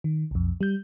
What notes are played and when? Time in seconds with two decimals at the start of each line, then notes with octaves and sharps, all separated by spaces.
0.04 D#3
0.31 B1 F2
0.61 G3 G6